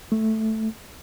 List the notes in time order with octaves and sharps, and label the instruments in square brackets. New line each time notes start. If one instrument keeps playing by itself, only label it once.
[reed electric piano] A3